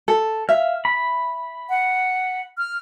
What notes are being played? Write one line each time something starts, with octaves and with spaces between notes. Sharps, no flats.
A4
E5 F5
B5
F#5
F6